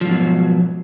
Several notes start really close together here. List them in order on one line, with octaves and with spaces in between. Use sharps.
F3 G#2 B2 F#3